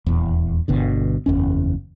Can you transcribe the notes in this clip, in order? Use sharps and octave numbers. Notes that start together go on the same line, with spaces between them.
D#1 E2
G1 B2 D3
F#1 E2 C#4